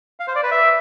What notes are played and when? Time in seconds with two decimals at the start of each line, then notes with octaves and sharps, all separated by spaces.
0.20 F5
0.28 C5
0.35 D5
0.43 B4
0.51 E5